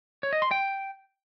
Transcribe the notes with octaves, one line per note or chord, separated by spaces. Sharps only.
C#5
D#5
C6
G5